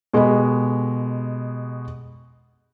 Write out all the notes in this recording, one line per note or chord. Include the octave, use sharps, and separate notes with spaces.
B2 G#3 G4 A4 D#5 B5